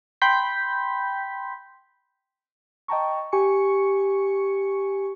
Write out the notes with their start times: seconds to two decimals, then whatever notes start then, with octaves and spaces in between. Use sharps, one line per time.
0.22 G5 B5 C6 G6 B6
2.88 D#5 G5 A5 A#5 C#6
3.32 G4 G#5 C#6 C#7